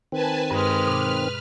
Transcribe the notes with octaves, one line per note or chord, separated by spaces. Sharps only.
D#3 C4 B4 G#5 A5
G2 G#3 B4 F6
B2 D6